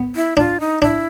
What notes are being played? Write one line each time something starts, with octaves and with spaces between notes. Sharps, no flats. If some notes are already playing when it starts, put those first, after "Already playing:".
Already playing: B3
E4
D4 F4
D#4
D4 E4